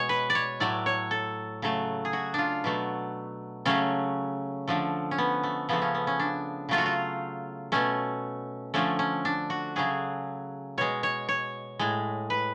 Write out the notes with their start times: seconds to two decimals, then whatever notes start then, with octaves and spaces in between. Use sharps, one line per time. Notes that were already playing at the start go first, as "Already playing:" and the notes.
Already playing: B2 G#3 C#5
0.09 B4
0.30 D5
0.35 C#5
0.60 A2 F#3 A3 D5
0.86 C#5
1.11 A4
1.62 C#3 F#3 A3
2.05 G#4
2.13 F#4
2.34 D4 F4
2.64 B2 F#3 A3
3.65 C#3 F#3 A3 C#4
4.68 D3 F3 A3
5.11 C#4
5.18 B3
5.43 A3
5.69 C#3 F3 A3 B3
5.82 C#4
5.94 B3
6.07 C#4
6.20 D4
6.69 C#3 F#3 A3 F4
6.78 F#4
6.86 F4
7.72 B2 A3 C#4
8.74 D3 F3 A3 C#4
8.99 C#4
9.25 D4
9.50 F#4
9.76 C#3 F#3 A3 G#4
10.78 B2 G#3 C#5
11.03 C#5
11.29 C#5
11.79 A2 G#3
12.30 B4